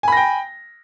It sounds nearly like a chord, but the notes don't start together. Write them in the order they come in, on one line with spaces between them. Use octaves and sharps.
G#5 B5 A#6 G5